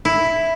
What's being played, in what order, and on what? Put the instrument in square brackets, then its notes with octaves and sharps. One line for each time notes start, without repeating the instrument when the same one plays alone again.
[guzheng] E4